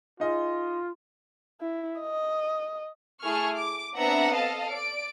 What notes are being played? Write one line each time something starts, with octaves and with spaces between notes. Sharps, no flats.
D#4 F4 G#4 D#5
E4
D#5
A3 E4 G#4 C#6 F6
D6
B3 C4 D4 E5 F#5 A#5
A4 D#5 F5 A5
D5 D7